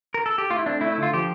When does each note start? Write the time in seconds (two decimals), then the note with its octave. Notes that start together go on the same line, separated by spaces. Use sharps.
0.14 A#4
0.26 A4
0.38 G4
0.50 A3 F4
0.59 E4
0.66 C4 D4
0.81 A3 E4
0.92 E4
0.98 D3 F4
1.14 F3 G4